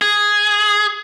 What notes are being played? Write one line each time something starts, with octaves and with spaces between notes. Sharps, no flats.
G#4